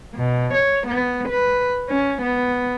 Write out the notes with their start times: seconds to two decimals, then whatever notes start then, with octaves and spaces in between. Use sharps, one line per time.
0.15 B2
0.54 C#5
0.87 B3
1.29 B4
1.89 C#4
2.22 B3